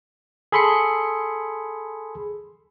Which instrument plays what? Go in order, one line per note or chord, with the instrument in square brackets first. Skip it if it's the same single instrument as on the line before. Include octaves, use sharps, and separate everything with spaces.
[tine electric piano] G#4 A4 B5 C6 C7 C#7